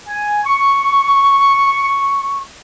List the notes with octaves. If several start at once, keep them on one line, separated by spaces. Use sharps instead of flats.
G#5
C#6